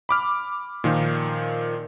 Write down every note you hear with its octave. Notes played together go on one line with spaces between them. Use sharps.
B5 D6 F6
A#2 D#3 F3